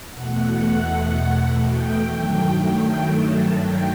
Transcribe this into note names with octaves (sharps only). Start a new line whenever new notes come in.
E2 B2 A3 F#5
G5
G2 D#3 F#3 A3
G5
A5
G5